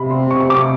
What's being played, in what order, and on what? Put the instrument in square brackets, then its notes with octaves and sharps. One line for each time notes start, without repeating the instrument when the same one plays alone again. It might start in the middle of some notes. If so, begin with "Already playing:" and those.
Already playing: [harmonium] C3 [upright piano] B5
[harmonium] C4 [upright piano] C6
[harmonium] C3 [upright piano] C#6
[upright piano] C#6
[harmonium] C3 [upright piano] D6